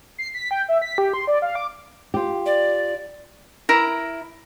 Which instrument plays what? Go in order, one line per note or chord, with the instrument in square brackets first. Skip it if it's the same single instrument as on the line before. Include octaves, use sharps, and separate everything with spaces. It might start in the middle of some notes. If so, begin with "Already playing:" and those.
[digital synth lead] C7
B6
G5
E5
B6
G4
C6
D5
F5
D6
[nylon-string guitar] F4 G4
[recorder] D5
[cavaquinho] E4 A#4 A#5